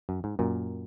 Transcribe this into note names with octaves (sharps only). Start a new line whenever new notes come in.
F#2
G#2
F#2 A#2